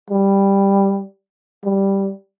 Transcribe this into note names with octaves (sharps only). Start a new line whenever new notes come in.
G3
G3